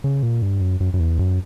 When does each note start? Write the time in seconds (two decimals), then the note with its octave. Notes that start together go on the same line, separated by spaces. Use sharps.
0.04 C#3
0.23 A#2
0.42 G2
0.61 F#2
0.80 F#2
0.94 F#2
1.00 E2
1.19 F#2